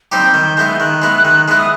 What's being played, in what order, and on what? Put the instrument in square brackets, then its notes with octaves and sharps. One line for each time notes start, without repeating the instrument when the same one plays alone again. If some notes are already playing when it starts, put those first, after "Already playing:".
[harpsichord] G3 C4 D#4 G4 [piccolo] G6
[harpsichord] D#3
G#3 B3 E4
[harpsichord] D#3 [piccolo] F#6
[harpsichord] G#3 B3 E4
D#3
G#3 B3 E4
[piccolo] D#6